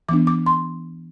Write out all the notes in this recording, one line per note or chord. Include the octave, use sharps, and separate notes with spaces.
E3 B3 D4 D6
D6
C6